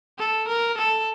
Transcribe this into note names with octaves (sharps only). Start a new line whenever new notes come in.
A4
A#4
A4